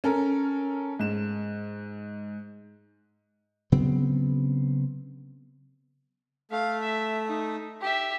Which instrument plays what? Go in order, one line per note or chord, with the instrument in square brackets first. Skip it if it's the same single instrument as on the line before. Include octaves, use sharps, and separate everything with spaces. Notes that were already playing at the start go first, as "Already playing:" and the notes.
[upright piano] C#4 A4 A#4
G#2 E7
[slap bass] C#3 F#3 B3 C4
[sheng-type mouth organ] A3 [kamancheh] F5
[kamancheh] E5
D#4
G4 E5